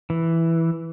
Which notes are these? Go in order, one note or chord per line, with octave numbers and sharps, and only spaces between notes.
E3